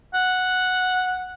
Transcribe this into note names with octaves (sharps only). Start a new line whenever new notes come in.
F#5